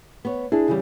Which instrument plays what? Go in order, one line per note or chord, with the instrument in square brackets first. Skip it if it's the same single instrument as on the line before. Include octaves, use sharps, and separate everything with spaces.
[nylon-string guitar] B3 C#5
[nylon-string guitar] D4 [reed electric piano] E4 G#4
[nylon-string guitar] C#3 E3 G3